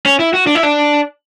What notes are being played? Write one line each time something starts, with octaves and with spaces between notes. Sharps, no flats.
C#4
E4
F#4
D4
E4
D4